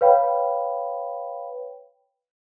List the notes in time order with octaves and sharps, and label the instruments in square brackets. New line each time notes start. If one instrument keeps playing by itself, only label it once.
[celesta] B4 C#5 F5 G5 B5